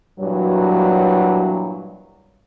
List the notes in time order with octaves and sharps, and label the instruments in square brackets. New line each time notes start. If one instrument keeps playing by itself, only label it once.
[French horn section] G2 A#2 E3 F#3